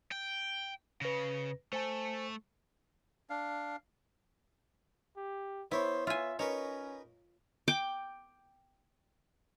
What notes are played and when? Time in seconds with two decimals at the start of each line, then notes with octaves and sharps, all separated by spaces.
0.12 G5
1.01 C#3 B4 A#6
1.73 A3 C5 G#5 A5
3.30 D4 F5
5.17 G4
5.72 B3 E4 C5 C#5
6.07 F4 E5 G#5
6.39 C#4 D#4 A#4 B4 C#5
7.68 G5 D6